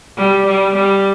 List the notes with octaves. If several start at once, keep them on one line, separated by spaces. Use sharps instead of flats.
G3
G3
G3